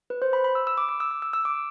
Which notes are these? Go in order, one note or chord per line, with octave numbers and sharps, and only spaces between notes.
B4
C5
B5
B5
E6
E6
D6
D6
E6
D6
E6
E6
D6